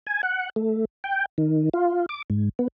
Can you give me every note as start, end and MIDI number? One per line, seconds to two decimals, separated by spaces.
0.07 0.21 80
0.23 0.50 78
0.56 0.85 57
1.04 1.25 79
1.38 1.69 51
1.74 2.06 65
2.09 2.22 86
2.30 2.49 44
2.59 2.68 59